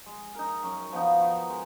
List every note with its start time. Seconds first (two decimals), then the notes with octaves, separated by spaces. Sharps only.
0.06 G#3
0.35 D#4 A#4
0.63 F#2
0.92 F3 B3 D#4
1.21 D#3
1.49 G#3